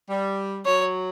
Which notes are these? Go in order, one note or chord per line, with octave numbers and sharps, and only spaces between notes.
G3
F#3 C#5